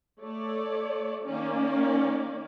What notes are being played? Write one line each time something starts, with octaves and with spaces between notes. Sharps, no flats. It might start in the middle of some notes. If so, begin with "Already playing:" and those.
A3 C#5 D5
D#3 A#3 C#4 D5